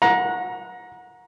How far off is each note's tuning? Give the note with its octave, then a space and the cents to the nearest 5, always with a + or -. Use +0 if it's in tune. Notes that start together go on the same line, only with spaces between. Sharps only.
F#5 -25 A#5 +15